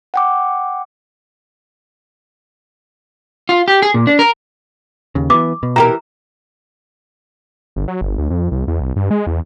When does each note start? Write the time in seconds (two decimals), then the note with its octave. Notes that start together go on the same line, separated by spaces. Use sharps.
0.14 F#5 G5 D6
3.49 F4
3.68 G4
3.82 G#4
3.94 A#2
4.07 D4
4.19 A#4
5.15 D#2 C#3
5.30 E3 B3 D6
5.63 B2
5.76 E3 G4 A#4 A#5
7.76 G1
7.88 F#3
8.01 G1
8.18 D2
8.30 F2
8.52 C2
8.68 E2
8.81 C2
8.96 G2
9.11 G#3
9.27 E2